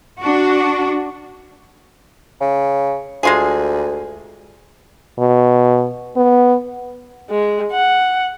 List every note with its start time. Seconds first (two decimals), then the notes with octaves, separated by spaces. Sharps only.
0.19 D4 F#4
2.41 C#3
3.23 D2 G#3 F4 G#4
5.19 B2
6.17 B3
7.30 G#3
7.72 F#5